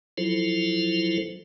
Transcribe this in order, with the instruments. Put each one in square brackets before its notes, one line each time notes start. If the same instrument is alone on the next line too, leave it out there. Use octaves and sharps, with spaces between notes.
[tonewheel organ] F3 F#3 E4 F4 A4 C5